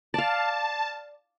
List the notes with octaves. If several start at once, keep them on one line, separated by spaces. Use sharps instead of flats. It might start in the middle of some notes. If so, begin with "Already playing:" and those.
D5 F5 A5